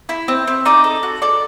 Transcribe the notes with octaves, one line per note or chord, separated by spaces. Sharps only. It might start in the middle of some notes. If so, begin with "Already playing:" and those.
E4
C4
C4
D#4 D5
A4
F#4
A4 D5